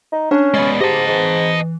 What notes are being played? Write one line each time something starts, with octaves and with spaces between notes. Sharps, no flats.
D#4
C#4 D4
G#3 B3 D5
G#2 G4 D#5 A5
G#2 E3